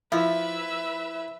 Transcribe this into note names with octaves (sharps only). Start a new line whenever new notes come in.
F3 E4 B4 E5